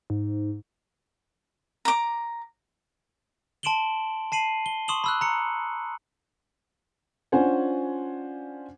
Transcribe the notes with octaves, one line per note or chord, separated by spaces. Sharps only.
G#2
A#5 D6
A5 C6 D7 E7 F#7 G7
A5 C7 D#7 F#7
G7
C6 C#6 D#6 E7 F#7 G7
B5 E6 F#6
A#5 C#7
C#4 D4 F4 C5 F#5 G#5